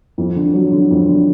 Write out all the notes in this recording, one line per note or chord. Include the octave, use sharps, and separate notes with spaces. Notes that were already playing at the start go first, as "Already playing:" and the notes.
F2
D3
F#3
D3
F2
D3